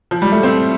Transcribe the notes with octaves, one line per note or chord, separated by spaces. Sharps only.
F3
G3
A3
C4